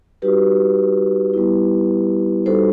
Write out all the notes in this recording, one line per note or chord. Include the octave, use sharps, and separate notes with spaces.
G3 D#4 F#4 G4 B4
G3 B3 E4
G3 D#4 F#4 A4 C5